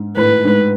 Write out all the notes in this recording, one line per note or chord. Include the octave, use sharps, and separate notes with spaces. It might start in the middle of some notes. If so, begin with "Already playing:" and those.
Already playing: G#2
A2 B4
G#2